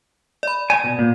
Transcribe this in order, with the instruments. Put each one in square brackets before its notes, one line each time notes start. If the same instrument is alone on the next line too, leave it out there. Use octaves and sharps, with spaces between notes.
[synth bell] D5 B5
[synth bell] D5 [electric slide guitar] G#5
[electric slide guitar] B2
A#2